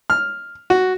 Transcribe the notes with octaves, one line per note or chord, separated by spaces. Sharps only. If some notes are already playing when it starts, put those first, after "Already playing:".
F6
F#4